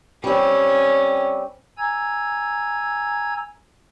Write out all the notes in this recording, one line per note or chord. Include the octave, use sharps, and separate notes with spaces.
G3 C4 C#4
G#5 A#5 E6 G#6